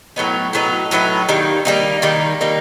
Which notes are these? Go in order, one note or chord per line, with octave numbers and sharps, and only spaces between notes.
A2 F#3 B3 D#4
A2 F#3 B3 D#4
A2 F#3 B3 D#4
D#3 G3 A#3 D#4
D#3 G3 A#3 D#4
D#3 G3 A#3 D#4
D#3 G3 A#3 D#4